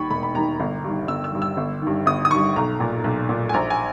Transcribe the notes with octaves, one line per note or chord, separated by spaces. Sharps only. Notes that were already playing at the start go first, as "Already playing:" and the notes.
Already playing: D#2 D#3 B5 C#6
E1 B5
B5
D#2 D#3 A#5
G1
G2 D#3
G1 E6
E6
G2 D#3
E6
G1
G2 D#3
G1 D#6
D#6
G2 D#3 C#6
B1 A#5
A#2
B1
A#2
G#5
A#1 A#5
G#5